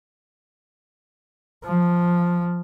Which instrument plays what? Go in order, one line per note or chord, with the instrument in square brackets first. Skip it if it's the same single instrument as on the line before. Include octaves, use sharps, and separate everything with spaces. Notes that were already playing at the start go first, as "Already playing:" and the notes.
[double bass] F3